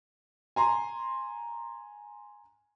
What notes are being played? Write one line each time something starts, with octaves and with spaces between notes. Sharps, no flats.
G#5 A#5 C6